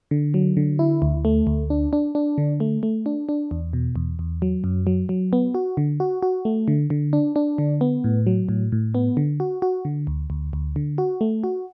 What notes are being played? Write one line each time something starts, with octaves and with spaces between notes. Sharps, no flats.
D3
F#3
D3
E4
D2
A3
D2
D4
D4
D4
D3
A3
A3
D4
D4
E2
B2
E2
E2
F#3
F#2
F#3
F#3
B3
F#4
D3
F#4
F#4
A3
D3
D3
D4
D4
D3
B3
A2
F#3
A2
A2
B3
D3
F#4
F#4
D3
D2
D2
D2
D3
F#4
A3
F#4